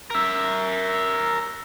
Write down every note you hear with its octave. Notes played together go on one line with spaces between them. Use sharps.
A#4 E5